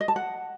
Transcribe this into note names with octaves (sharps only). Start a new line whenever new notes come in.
D#5
A5
F#5